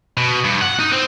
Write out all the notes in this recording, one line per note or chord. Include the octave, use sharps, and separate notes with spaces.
B2
G2
F#5
D#4
C4